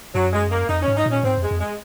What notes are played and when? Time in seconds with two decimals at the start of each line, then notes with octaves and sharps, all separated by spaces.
0.15 F#2 F#3
0.33 G#3
0.51 A#3
0.69 F2 D#4
0.83 C#4
0.88 G#2
0.97 D#4
1.06 A#2 C#4
1.23 G#2 C4
1.37 F2
1.42 G#3
1.51 F2
1.60 G#3